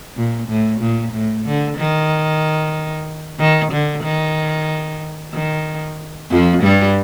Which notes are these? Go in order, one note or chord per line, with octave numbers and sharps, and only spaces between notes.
A#2
A2
A#2
A2
D3
D#3
D#3
D3
D#3
D#3
F2 F3
G2 G3